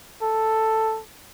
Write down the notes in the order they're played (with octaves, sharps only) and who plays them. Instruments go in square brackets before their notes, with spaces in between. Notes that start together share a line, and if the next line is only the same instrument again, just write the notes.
[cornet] A4